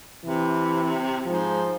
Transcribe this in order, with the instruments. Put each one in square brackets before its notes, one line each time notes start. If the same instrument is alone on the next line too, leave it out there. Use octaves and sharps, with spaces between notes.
[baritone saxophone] C3 [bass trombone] E3
[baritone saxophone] G#2 [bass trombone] F3